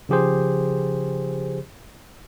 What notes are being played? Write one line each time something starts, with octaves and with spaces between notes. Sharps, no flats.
C#3 F3 G4 G#4 C5